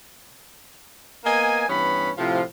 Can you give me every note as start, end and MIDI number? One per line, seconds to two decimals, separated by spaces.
1.25 1.66 58
1.25 1.66 59
1.25 1.66 75
1.25 1.66 80
1.68 2.10 43
1.68 2.10 52
1.68 2.10 59
1.68 2.10 61
1.68 2.10 83
2.17 2.41 45
2.17 2.41 48
2.17 2.41 53